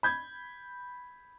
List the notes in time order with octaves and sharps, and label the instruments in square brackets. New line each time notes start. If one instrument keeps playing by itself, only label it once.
[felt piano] B5 G6 G#6